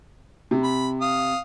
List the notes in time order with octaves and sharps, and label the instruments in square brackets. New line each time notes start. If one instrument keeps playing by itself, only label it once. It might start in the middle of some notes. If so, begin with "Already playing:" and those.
[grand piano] C3
[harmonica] B5
F5 D#6